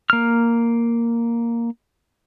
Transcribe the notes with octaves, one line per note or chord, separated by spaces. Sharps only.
A#3 F6